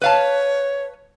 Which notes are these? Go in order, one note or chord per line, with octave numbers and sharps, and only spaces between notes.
B4 C#5 F5 A5